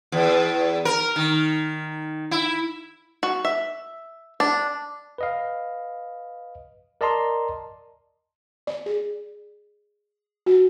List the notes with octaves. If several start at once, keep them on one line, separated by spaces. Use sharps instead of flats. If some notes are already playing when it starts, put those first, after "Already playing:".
E2
A#4
D#3
E4
F#4
E5
D4
B4 D#5 F5
A#4 D5 D#5 A5 A#5 C6
D5
G#4
F#4